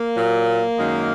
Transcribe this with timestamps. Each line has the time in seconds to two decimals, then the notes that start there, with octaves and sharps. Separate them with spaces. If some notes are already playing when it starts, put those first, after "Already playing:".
Already playing: A#3
0.15 A#2 F#3
0.76 F#2 D#3 G#3